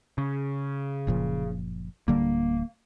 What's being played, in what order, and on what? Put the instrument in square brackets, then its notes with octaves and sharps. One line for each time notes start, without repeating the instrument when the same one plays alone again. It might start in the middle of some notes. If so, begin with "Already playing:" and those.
[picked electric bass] C#3
[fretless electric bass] F#1 A#2 F3
[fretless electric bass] D1 D3 G3 [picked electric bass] A#3